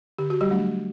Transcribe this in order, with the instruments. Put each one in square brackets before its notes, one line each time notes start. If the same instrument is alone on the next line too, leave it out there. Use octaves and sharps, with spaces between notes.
[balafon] D3 G4
F#4
G3 G4
F#3 A3 D4